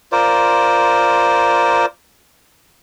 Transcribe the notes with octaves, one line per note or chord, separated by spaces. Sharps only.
F4 A#4 C5 D5